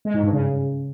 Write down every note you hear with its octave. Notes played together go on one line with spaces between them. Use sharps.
G#3
G#2
G2
C#3